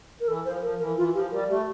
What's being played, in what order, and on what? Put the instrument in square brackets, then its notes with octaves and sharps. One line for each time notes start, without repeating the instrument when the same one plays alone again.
[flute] A#4
[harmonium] E3 [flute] A4
[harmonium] F3 [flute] C5
[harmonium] F3 [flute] A#4
[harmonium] E3 [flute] A#4
[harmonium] E3 [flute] F4
[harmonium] F3 [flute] G4
[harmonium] G3 [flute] A#4
[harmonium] A3 [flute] G4